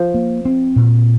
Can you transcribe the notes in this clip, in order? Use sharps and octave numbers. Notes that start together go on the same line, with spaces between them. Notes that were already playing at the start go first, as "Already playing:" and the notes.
Already playing: F3
A#3
C4
A#2